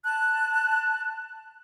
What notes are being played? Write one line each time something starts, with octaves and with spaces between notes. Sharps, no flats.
A5 F#6